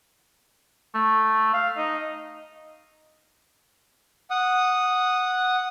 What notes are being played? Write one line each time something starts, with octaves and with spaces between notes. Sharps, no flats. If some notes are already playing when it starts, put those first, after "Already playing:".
A3
F5
D#4
F#5 D#6